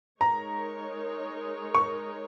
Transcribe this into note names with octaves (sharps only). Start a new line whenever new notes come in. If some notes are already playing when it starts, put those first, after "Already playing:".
G#3 D#4 A#4 C#5 A#5
C#6